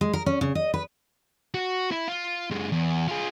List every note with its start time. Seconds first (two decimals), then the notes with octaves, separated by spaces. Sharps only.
0.01 G#3
0.13 A#4
0.26 C#4
0.41 C#3
0.55 D#5
0.74 B4
1.54 F#4
1.92 E4
2.08 F4
2.51 F#2 G#3
2.72 E2
3.08 F4 G#4